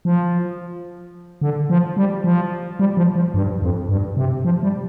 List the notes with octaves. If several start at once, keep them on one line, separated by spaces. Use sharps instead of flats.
F3
D3
F3
G3
F3
G3
F3
F3
G2
F2
G2
C3
F3
G3